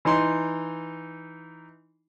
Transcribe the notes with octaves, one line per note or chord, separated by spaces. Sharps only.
E3 D#4 C6